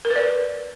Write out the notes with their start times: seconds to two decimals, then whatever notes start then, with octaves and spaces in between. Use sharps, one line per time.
0.05 A#4
0.10 B4
0.16 D5